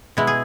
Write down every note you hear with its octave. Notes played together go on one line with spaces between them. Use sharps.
B2 G#3 E4
G#4